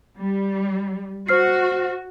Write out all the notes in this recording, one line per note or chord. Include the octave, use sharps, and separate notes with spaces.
G3
F#4 C5 F6 C7